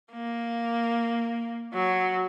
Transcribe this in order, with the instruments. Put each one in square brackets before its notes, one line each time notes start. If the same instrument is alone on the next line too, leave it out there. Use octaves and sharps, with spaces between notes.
[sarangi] A#3
F#3